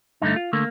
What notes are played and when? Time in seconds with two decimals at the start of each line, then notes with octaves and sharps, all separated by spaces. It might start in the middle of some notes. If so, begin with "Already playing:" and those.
0.22 G2 D3 A3 D#4
0.36 F4
0.53 D3 A3 A#3